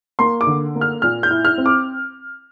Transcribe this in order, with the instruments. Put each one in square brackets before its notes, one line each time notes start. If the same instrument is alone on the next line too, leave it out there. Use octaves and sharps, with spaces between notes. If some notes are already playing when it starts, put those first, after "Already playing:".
[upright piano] A#3 C6
D6
D3
A#3
F6
A#2 F6
G6
E4
F6
C4
D6